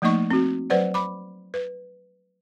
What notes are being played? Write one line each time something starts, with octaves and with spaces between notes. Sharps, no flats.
F3 A3 A#3 D#4 D#5 C#6
C4 F#4
F#3 B4 C5 D5 F#5
B5 D6
B4